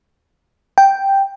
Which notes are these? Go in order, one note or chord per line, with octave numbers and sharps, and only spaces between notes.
G5